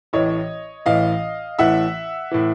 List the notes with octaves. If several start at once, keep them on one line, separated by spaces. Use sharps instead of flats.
A1 A2 E3 C#5 D#5
A1 A2 E3 D#5 F5
A1 A2 E3 E5 F#5
A2 E3